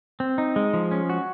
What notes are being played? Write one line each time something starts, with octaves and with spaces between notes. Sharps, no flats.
C4
D#4
G#3
F3
C#4
F#4